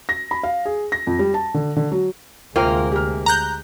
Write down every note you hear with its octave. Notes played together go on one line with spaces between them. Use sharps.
A#6
B5
F5
G#4
A#6
F2
G3
A5
D3
D3
F#3
D2 C3 G#3 A#3 F4 A#4 C5 G5
G4 F6
A#5 F#6 G6